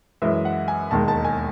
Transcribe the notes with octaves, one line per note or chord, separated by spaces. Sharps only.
F#2 E3 G#3 E5
F#5
G#5
E1 D#2 D#3 G#3 A5
A5
G#5